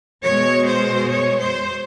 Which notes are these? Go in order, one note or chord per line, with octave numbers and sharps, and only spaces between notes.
B2 G#3 C#5
C5
C#5
C5